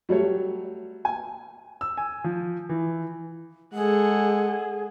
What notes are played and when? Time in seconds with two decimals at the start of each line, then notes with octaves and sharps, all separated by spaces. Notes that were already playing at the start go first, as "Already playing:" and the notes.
0.09 F#3 G3 A3 C#5
1.05 G#5
1.81 E6
1.97 G#5
2.24 F3
2.69 E3
3.74 G#3 G#4 A4 F#5